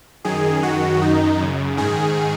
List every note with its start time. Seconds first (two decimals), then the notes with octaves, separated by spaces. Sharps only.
0.25 F#2 D#3 G#4
0.63 F#2 D#3 F#4
1.01 F#2 D#3 D#4
1.39 F#2 C#3
1.77 G#2 D#3 G#4